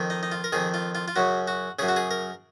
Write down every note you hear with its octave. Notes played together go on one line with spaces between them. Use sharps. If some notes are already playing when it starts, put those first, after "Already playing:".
Already playing: F2 D#3
D#4
D#4
F4
A#4
F2 D#3 G#4
F4
F4
F4
F#2 C#3 F#4
F#4
F#2 C#3 G#4
F#4
G#4
A#4